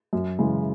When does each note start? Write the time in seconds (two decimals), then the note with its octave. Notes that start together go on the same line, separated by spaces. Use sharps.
0.13 F#2
0.39 C#3 E3 G#3